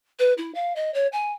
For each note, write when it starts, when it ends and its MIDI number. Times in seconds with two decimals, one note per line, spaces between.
0.19 0.33 71
0.38 0.54 64
0.55 0.73 77
0.76 0.93 75
0.94 1.07 73
1.12 1.32 80